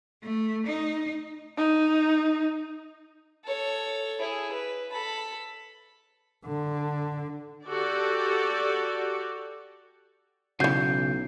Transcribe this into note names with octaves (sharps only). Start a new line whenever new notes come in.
A3
D#4
D#4
A4 C#5
E4 G#4
B4
A4 B5
D3
F#4 G4 A4 D5
B1 C#3 E3 F#3 G6 C7